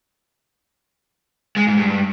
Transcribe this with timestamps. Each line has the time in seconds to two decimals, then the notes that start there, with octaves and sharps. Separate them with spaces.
1.56 G#3
1.67 G#2
1.77 G2